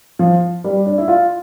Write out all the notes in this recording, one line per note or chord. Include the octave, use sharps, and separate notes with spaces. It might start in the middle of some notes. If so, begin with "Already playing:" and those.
F3
G3
D4
E4
F4